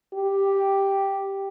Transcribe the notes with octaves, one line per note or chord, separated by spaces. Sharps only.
G4